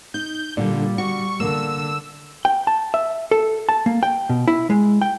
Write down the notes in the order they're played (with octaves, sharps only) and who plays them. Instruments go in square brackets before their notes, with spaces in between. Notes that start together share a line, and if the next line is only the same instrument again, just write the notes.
[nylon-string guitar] D#4 [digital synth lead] G6
[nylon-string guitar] A#2 [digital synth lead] D3 [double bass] G3
[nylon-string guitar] F#4 [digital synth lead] C#6
[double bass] D3 [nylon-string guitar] A#3 [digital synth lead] E6
[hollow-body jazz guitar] G5
A5
E5
A4
A5
A#3
G5
B2
E4
G#3
G5